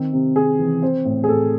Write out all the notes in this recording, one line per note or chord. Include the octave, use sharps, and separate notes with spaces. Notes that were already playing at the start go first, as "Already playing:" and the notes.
Already playing: D#3 C4
C3
C3 G#4
E3
C4 C5
A2
G#4
A2 A4